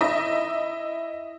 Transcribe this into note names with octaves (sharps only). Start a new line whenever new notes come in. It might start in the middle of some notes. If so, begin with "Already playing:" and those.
E4 D#5 E5